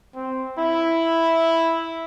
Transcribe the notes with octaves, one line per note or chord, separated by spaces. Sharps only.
C4
E4